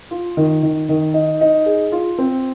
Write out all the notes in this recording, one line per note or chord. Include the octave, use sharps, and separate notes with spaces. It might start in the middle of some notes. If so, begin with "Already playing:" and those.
F4
D#3
D#3
D#3
D#4
D#4
G#4
F4
C4